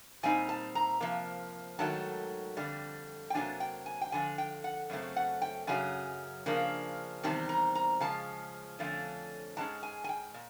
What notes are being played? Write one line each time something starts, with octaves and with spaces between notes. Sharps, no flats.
A#2 G3 C4 D#4 G#5
A5
A#5
C3 F3 A#3
G#2 D#3 F#3 A3 A5
F2 D3 G3
G5
C3 D#3 F#3 A#3 D4 G#5
G5
G#5
G5
F2 D3 F3 G#5
G5
F#5
F#2 C#3 A3 C4
F#5
G5
F#2 C#3 F#3 G#5
C#3 F3 A#3 D4
E2 C3 D#3 G3 C4 A5
A#5
A#5
C#3 F3 G#3 A5
F2 D3 F3 A3 C#4
G#2 E3 G#3 C#4 A5
G#5
G#5
G5
A#2